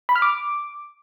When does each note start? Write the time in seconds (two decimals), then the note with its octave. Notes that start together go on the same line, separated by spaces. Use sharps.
0.09 B5
0.16 F6
0.22 D6